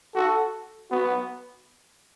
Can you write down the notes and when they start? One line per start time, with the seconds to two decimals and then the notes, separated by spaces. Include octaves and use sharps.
0.15 F#4 A4
0.92 B3 F#4